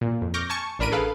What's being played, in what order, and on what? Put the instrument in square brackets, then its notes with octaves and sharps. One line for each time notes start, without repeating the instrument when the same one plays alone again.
[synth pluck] A#2
F2
C#6 D6 F6 G6 A#6
G#5 A5 C#6 C#7
A1 D4 A#4 B5 D7 D#7
G#4 A4 B4 F5